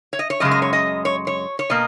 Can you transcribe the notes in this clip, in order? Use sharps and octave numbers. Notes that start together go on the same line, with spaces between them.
C#5
D#5
C#5
F#2 C#3 G#3 D#5
D#5
C#5
D#5
C#5
C#5
C#5
B2 A#3 D#5